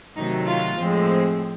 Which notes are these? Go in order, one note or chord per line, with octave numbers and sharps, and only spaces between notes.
C3 D#3 F#3 A3 D#4
F4
A2 F3 G#3 C4